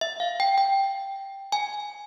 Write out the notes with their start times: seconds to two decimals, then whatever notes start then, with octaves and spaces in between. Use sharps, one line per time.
0.01 E5
0.20 F5
0.40 G5
0.58 G5
1.52 G#5